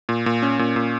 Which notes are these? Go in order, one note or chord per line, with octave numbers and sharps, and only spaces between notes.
A#2
A#2
C#4
A#2
A#2